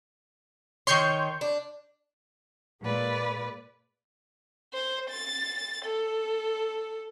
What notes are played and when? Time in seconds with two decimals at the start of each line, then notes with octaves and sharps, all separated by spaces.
0.87 D#3 C#5 C6 C#6 G6
1.41 D4
2.82 A#2 G#3 B4 D5
4.74 C5
5.11 A6
5.85 A4